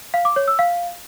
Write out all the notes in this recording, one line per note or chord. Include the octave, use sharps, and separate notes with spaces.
F5
D6
C#5
E6
F5